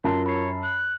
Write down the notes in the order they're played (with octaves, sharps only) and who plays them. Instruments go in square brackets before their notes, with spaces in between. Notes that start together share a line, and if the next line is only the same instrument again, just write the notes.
[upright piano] F#2 A5 [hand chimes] F4 A#4 [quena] C6
[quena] C#5 [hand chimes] B5 C7
[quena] F#6